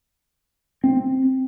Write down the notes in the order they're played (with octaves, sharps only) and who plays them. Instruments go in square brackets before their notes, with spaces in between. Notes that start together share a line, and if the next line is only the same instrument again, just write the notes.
[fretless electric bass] C4